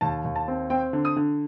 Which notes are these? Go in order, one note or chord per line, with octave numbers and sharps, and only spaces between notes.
D#2 A5
D#2
A5
C4
C4 G5
D3
D#6
D3